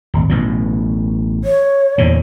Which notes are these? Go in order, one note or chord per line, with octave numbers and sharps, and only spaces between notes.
D1 G#1
A1 B2 F#3
C#5
E2 A#2 D3